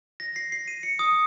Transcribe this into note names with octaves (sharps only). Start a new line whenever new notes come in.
A#6
C7
C7
D#7
C#7
D#6